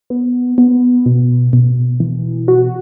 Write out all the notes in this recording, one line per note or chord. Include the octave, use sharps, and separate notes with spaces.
B3
B3
B2
B2
E3
F#4